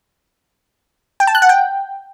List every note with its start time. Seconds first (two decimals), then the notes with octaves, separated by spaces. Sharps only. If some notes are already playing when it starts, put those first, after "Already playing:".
1.20 G5
1.27 A5
1.35 F#6
1.42 F#5
1.49 G5